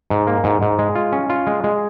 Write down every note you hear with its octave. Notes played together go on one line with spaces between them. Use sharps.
G#2
A#3
G#2
G#2
G#3
F4
C#4
F4
G#3
G#3